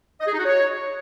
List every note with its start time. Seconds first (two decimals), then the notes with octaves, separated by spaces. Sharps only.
0.21 D#5
0.27 G#4
0.33 D#4
0.39 F#4
0.45 C#5